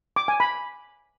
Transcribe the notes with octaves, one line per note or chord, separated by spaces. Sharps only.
D6
G#5
B5